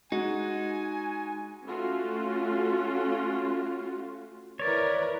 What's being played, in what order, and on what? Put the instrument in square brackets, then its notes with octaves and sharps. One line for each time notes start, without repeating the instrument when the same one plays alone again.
[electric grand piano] G#3 F#4 [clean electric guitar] D#4 [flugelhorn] G#5
[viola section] A3 C#4 F4 F#4
[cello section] E4 A#4 B4 [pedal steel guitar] C#5 D5